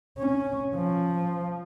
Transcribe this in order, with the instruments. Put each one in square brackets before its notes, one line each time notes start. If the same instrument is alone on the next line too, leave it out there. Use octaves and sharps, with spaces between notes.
[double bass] C#4
F3